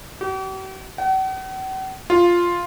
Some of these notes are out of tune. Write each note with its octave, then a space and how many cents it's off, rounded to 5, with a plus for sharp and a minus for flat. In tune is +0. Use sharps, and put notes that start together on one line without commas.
G4 -45
F#5 +45
F4 +0